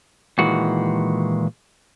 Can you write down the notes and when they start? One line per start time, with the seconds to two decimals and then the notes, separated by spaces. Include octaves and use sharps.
0.39 A#2 D#3 E3 G#3 F#4